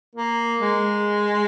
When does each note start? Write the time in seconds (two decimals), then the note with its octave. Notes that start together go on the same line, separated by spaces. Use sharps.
0.15 A#3
0.60 G#3